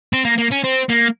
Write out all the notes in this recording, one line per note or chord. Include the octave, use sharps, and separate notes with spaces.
C4
A#3
A#3
C#4
C4
A#3